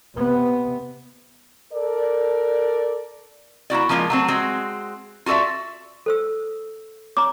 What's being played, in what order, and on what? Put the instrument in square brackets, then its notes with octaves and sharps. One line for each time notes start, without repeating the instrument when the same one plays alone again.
[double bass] C3 B3
[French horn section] A4 A#4 D5
[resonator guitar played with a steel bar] A#3 E4 F#4 D5
F3 G#3 A#3 D#4 F4
F#3 A3 C4
G#3 C4 F#4
F4 F#4 A4 D5 E5
[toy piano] A4 C5 E6
[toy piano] C#5 A#5 [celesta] D6